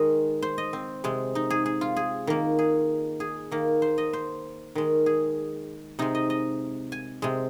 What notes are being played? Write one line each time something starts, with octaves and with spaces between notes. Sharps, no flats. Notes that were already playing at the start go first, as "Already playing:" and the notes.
Already playing: D#3 G#3 D#5
C5
D#5
C4
C3 G#3
D#4
G#4
G#4
F4
G#4
D#3 A#3
G#4
G#4
D#3 A#3
C5
D#5
C5
D#3 G#3
G#4
C3 G#3 D#4
D#5
D#5
G#5
C3 G#3